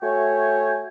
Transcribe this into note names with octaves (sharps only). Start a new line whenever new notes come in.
A3 F#4 C#5 E5 G5 G#5